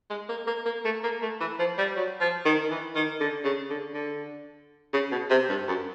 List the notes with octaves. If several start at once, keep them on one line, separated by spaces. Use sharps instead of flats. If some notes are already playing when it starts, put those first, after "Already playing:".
G#3
A#3
A#3
A#3
A3
A#3
A3
E3
F3
G3
F#3
F3
D#3
E3
D#3
D3
C#3
D3
D3
C#3
B2
C3
G2
F#2